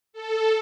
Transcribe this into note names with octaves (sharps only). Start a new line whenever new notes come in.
A4